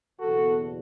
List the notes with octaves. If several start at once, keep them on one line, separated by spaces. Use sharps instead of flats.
F#1 E2 B2 F#4 A4